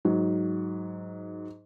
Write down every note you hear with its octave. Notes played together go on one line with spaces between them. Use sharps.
G#2 F#3